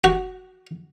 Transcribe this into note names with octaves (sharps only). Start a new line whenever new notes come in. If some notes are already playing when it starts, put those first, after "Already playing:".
F#4